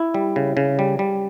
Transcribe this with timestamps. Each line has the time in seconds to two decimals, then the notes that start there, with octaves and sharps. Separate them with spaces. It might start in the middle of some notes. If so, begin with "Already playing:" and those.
Already playing: E4
0.14 G3
0.36 C#3
0.57 C#3
0.79 G3
0.99 G3